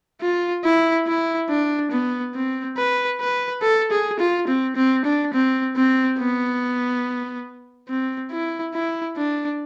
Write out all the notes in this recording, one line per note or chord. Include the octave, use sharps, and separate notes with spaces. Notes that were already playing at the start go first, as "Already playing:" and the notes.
F4
E4
E4
D4
B3
C4
B4
B4
A4
G#4
F4
C4
C4
D4
C4
C4
B3
C4
E4
E4
D4